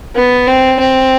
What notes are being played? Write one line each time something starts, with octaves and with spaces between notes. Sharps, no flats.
B3
C4
C4